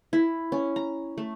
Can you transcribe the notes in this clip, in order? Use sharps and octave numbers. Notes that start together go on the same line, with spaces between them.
E4
C#4
A#5
A3